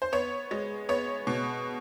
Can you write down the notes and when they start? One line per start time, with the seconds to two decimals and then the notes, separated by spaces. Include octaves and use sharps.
0.02 C5
0.12 B3 C#5
0.51 G#3
0.89 B3 C#5
1.27 B2